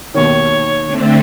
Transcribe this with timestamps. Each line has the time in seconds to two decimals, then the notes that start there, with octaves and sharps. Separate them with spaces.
0.14 D#2 B2 D#3 C#5
0.85 D3 A3 C4